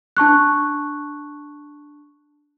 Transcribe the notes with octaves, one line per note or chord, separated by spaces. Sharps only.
D4 A5 C#6 F#6